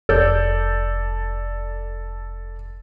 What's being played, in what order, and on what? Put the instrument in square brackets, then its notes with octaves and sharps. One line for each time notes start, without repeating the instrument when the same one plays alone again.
[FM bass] F1 [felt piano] A4 D5 G6